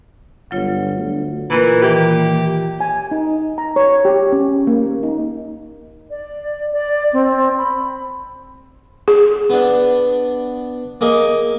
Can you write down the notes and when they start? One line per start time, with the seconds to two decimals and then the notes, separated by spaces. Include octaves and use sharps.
0.51 G1 F#3 F4 C#5
0.98 D2
1.50 A#2 E3 A#4 A#5
1.82 D#3 E3 A#3 G4
2.80 G#5
3.11 D#4
3.58 A#5
3.76 C#5
4.05 G4
4.32 C#4
4.67 A#3
5.03 D#4
6.09 D5
6.72 D5
7.13 C4
7.58 B5
9.08 G#4
9.50 B3 D4
11.01 A#3 G#4 D#5